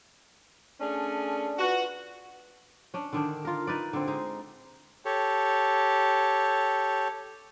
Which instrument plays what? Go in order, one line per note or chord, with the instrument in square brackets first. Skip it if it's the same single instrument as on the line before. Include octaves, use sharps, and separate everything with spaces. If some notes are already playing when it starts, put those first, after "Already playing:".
[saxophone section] A3 C#4 G#4 [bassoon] D4
[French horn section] F4 B4 [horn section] F#4
[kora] C#4 D4
D3 D#3 D4
F4 A#4
D#4 B4 D5
D3 C4
G#3 D#4
[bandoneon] G4 A4 C#5